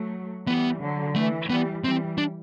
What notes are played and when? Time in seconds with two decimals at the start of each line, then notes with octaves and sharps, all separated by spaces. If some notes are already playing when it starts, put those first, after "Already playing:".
Already playing: F#3 A3
0.48 E3 G3 B3
0.81 D3 F#3
1.15 E3 A3
1.49 E3 G3 B3
1.83 E3 G3 C4
2.18 D4